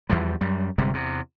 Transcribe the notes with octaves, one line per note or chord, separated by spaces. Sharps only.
E2 E3 F3 G3
F#2 G3
G1 C3 G3 G#3
E2 C3